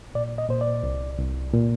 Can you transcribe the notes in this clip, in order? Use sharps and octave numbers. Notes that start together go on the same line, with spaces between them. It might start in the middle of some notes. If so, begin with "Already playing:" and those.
A#2 D5
D#5
A#2 C5
D5
C2
C2
A#2